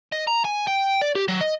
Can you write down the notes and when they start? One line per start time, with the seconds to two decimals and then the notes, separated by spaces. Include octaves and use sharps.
0.12 D#5
0.27 A#5
0.44 G#5
0.67 G5
1.01 D5
1.15 G4
1.28 F#3
1.41 D#5